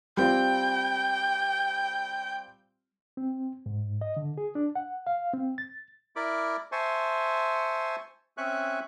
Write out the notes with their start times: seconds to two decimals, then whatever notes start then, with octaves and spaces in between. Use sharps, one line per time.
0.17 G3 C4 F4 G5
3.17 C4
3.66 G#2
4.01 D#5
4.17 D3
4.38 G#4
4.55 D4
4.75 F#5
5.07 F5
5.33 C4
5.58 A6
6.16 E4 A#4 D5 B5 D6
6.72 C5 E5 G#5 A5 C6 C#6
8.38 C4 C#4 E5 G#5 C#6 F#6